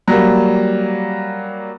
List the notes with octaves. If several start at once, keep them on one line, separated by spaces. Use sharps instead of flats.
F#3 G3 A#3